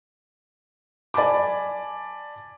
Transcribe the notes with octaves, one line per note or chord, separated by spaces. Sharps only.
D5 G#5 A5 B5 D6